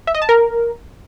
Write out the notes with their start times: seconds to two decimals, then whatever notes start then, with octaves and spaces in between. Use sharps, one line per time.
0.07 E5
0.15 D#5
0.22 A5
0.29 A#4